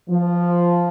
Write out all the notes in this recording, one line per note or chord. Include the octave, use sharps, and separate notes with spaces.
F3